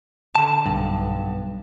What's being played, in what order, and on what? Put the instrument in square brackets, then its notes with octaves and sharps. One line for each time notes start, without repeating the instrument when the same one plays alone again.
[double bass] D3 [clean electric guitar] A5
[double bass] B1 B3 [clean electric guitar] G2